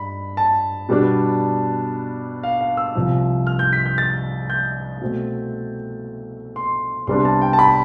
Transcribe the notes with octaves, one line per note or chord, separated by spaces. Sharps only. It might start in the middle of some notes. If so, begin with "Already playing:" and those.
Already playing: G2 B5
A5
B2 G3 B3 D4
F5
F5
E6
C2 C3 F3
F6
G6
B6
G6
A6
G6
B2 A3 C4
C6
C2 C3 G3 B3 D4 C6
A5
G5
A5
B5